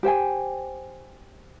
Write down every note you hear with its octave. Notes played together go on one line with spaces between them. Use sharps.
G4 C5 G5 G#5